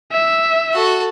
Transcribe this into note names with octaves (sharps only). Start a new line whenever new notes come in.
E5
F#4 A4